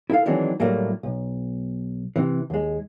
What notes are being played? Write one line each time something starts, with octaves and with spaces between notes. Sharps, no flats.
E4 A4 F5
D#3 E3 F#3 G#3 C4 D4
A2 F#3 G3 A3 A#3
B1
C3 E3
D#2 G#3